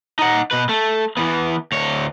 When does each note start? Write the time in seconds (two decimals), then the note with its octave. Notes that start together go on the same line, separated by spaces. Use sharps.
0.19 D#4 F#5
0.51 B2 B4
0.69 A3
1.17 E3 B3
1.72 D2 C#5